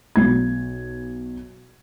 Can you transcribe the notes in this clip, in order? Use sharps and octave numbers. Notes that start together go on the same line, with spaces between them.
B1 G#6